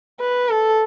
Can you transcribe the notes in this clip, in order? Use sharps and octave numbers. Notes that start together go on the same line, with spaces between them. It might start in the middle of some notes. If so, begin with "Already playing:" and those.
B4
A4